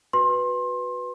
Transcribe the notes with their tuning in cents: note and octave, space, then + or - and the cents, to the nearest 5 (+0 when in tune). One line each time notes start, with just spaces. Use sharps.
F#4 +0 B4 +0 C6 +25